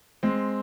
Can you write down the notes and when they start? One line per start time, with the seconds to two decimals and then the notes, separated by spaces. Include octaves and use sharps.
0.23 G#3 C4